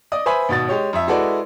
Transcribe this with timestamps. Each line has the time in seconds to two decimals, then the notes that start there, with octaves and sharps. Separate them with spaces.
0.12 D5 D#5 D#6
0.26 B4 C5 E5 G#5 B5
0.49 G#1 B2 F#4 A6
0.69 G#3 G4 C#5
0.93 F2 E5
1.08 G#3 E4 F#4 A4 B4 D5